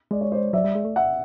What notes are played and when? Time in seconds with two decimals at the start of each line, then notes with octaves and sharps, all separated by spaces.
0.11 G#3 D5
0.21 C#5
0.32 C5 D5
0.53 F#3 D5 E5
0.64 G3
0.75 G#3
0.85 A3
0.96 E5 F#5